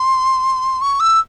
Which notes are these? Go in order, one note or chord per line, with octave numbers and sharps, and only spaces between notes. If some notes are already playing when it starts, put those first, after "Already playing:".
Already playing: C6
C#6
E6